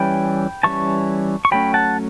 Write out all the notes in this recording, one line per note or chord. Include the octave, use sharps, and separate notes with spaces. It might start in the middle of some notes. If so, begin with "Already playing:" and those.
Already playing: E3 G3 C#4 G5 B5
E3 G3 C#4 A5 C#6
C#6
F#3 A3 C#4 G5 B5
F#5 A5